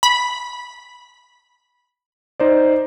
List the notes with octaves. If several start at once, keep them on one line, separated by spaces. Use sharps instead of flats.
B5
D#4 C5 D5